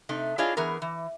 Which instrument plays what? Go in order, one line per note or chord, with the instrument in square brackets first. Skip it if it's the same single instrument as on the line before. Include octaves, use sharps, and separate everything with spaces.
[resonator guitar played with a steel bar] C3 A3 D#4
D4 E4 F4 G#4 C#5 D#5
E3 B3 G#4 A#4
E3